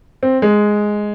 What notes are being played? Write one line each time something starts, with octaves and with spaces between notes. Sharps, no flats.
C4
G#3